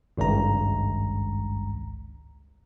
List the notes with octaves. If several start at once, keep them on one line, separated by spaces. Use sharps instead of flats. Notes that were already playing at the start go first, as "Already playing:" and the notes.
G#1 C#2 G2 A#5